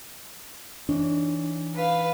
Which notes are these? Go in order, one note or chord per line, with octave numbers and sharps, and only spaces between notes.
E3 D4 D#4 C#5
B4 F5